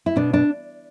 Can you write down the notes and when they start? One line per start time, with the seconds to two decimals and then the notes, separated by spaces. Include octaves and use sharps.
0.06 E4
0.16 B2 D4
0.33 D4